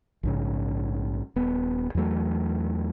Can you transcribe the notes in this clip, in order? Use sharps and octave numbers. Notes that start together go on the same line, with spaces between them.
A#1 G#2 C#3
D#1 B3
E2 E3 F#3 A3